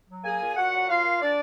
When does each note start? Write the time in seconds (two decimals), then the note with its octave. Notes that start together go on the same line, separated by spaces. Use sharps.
0.08 F#3
0.24 A#3 G#4 G#5
0.40 A#2
0.56 A#2 F#4 F#5
0.72 F#3
0.88 A#3 F4 F5
1.04 A#2
1.20 D4 D5